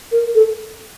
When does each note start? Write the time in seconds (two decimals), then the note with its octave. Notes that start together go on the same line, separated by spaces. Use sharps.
0.12 A#4
0.35 A4